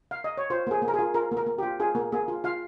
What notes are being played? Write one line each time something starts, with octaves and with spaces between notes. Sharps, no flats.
F5
D#5
C#5
F4 C5
A#3 G#4
A#3
A#4
G#4
F4
F4 A#4
A#3
A#4
A#3
G4
F4
F4 G#4
A#3
A#3 G#4
F4
F4 F5